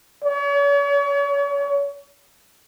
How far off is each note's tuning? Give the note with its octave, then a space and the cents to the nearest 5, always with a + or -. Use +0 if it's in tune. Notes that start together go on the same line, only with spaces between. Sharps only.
C#5 +40